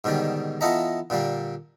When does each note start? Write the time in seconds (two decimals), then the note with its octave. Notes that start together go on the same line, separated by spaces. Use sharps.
0.04 G#2 B2 D3 D#3 G3
0.61 E3 B3 F4 A4 D#5 A#5
1.10 A#2 D3 G3 A#3